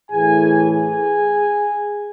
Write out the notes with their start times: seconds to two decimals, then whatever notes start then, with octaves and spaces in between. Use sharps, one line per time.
0.11 A2 E3 A3 G#4 G#5
0.69 G#4 G#5